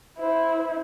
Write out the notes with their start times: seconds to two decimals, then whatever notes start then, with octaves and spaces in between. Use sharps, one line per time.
0.19 E4 C5
0.58 C5